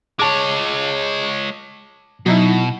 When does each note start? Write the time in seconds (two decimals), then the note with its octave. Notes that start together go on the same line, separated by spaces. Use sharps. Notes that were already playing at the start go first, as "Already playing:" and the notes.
0.19 G#3 C#5 A5 D6
2.26 B2 F#3 D#4 E4